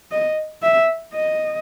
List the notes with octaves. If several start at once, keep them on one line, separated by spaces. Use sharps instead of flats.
D#5
E5
D#5